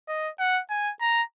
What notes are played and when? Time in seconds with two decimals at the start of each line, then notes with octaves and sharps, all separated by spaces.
0.08 D#5
0.39 F#5
0.70 G#5
1.01 A#5